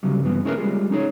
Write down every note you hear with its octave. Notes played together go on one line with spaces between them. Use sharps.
D2 C#3 F#3 G3
G2 E3 B3
C#4 E4 G#4 A#4 B4
G3 G#3 F4 G#4
C#4 D#4 G#4 C#5